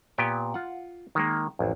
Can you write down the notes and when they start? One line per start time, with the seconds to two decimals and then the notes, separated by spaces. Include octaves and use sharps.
0.18 A#2 B3 G4 G5 G#5
0.54 F4 F#5
1.15 D#3 G#3 A#3
1.59 A1 F2